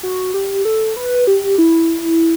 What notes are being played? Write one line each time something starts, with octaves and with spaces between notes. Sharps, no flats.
F#4
G4
A4
B4
G4
E4